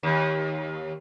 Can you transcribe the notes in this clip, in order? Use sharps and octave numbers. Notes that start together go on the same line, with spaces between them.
D#2